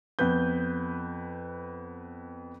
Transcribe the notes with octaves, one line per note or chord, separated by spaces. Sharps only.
F2 B3 B4 G6